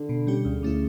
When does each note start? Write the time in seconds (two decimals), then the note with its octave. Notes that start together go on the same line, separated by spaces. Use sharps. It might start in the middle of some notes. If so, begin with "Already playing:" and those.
Already playing: D3
0.09 B2
0.27 G3 C#4 G4
0.45 D2 C#3
0.63 D3 A3 C#4 E4